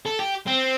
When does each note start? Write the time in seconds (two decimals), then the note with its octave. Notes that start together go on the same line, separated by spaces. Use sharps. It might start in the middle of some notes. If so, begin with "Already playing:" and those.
0.06 A4
0.20 G4
0.47 C4